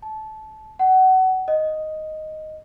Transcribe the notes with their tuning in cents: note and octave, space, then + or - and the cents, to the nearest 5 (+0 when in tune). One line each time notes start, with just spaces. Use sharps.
A5 -20
F#5 +25
D#5 +0